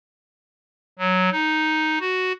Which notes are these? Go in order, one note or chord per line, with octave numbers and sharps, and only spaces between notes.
F#3
D#4
F#4